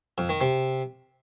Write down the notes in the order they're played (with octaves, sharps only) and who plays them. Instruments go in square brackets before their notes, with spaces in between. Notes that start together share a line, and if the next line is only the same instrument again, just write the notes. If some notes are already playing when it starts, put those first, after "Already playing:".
[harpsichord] F2
D#3
C3